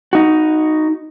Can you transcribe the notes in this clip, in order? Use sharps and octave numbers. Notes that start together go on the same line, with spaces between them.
D#4 F#4